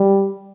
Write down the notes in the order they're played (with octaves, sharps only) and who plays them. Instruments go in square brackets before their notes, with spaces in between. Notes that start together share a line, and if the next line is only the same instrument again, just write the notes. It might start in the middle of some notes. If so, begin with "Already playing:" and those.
Already playing: [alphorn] G3